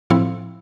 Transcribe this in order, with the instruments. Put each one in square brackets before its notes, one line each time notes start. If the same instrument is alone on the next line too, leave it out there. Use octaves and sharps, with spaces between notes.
[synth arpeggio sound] A2 F3 C4 E4